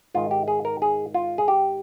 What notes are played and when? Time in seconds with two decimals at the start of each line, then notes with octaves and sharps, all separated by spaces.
0.14 G#2 D#3 F4
0.31 G4
0.48 G#4
0.65 A#4
0.82 G#4
1.14 F4
1.38 G#4
1.48 G4